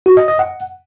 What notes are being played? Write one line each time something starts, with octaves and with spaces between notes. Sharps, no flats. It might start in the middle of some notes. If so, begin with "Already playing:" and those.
F#4
D#5
D#5
F#5